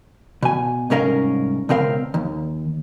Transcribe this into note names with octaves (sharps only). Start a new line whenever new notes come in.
B2 G#5
C2 G#2 C#4 A#4 D#5 F5
C#2 B2 C4 A#4 F5
D#2